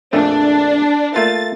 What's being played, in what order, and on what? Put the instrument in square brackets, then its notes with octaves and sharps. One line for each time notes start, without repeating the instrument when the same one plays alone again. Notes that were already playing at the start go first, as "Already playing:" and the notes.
[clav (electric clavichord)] A#1 F2 A3 [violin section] D4
[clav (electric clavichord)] A3 A#3 F4 [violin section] A6